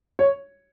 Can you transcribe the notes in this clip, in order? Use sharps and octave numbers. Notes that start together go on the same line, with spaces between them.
C#5